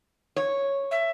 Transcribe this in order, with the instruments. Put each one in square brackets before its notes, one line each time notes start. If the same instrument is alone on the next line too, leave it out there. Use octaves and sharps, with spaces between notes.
[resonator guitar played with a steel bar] C#5
[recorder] E5